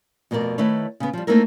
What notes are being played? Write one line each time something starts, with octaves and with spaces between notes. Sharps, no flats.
F2 B2 A3 A#4 D5
D#3 A3 E4 B4 C#5
C#3 B3
F3 G3
A3 A#3 C4 D#4 E4 A#4